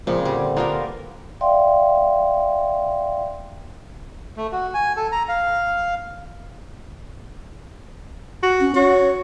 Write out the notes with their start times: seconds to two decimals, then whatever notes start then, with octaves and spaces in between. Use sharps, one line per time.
0.07 A#2 C#3 F3 C4
0.25 D3 G3
0.57 A#3 B3 D4 F4 G4 A#4
1.41 D5 E5 F5 G5 C6
4.37 A3
4.52 F#4
4.74 G#5
4.97 A4
5.12 A#5
5.29 F5
8.43 F#4
8.61 C#4
8.76 F#4 C#5